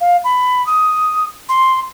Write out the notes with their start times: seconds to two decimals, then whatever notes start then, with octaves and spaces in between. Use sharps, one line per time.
0.01 F5
0.24 B5
0.66 D#6
1.49 C6